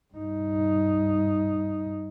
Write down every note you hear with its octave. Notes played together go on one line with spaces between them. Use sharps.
G2 D#4